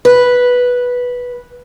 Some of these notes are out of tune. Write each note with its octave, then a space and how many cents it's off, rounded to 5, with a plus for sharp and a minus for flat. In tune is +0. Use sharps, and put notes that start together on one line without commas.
B4 -5